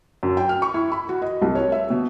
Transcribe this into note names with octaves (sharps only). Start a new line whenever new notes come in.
F#2
G5
F6
C#6
E4
B5
F#4
D#5
C2
C#5
E5
B2